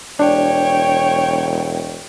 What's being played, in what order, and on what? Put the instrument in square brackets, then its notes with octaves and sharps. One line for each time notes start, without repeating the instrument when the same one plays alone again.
[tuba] E1 [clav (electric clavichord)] D4 [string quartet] C#5 G5